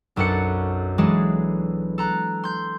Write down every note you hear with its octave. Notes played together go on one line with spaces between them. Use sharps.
B1 F#2 D4 A4 F#5 C#7
E3 F#3 G#3 D4 G#4 A4
A4 A#5 F#6
C6 G6